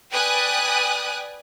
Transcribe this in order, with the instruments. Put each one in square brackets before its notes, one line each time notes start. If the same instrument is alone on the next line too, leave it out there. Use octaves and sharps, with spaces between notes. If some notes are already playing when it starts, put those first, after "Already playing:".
[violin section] B4 D5 G5 G#5 D#6 F#6